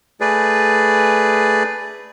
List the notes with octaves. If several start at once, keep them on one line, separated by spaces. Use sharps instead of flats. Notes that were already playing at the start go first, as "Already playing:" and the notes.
A3 G#4 B4 D5